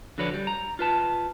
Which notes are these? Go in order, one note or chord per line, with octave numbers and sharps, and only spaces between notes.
D3 F3 F#4 B4 C#5 D5
G3
A#5
F4 B4 A5